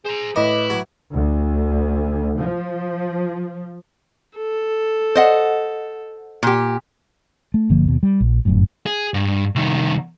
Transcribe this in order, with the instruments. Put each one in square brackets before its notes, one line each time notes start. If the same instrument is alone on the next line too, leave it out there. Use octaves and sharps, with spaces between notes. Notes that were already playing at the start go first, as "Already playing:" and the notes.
[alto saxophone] G#4 [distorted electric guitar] C5 A#5
[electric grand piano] A2 D6 [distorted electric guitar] E4 [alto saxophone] B4 [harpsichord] D#5
[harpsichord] F#3
[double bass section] D2
F3
[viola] A4
[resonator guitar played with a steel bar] C5 D#5 F#5
A#2 G4
[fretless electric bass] A3
G1 D3 F3 A#3
D#2 B2
G3
A#1
G1 F#2 A2
[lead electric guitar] G#4
G2
C2 D#3